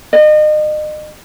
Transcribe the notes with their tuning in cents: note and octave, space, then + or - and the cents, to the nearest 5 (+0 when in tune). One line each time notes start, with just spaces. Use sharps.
D#5 -35